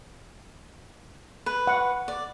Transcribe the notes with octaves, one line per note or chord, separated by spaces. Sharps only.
B4
F#5
D5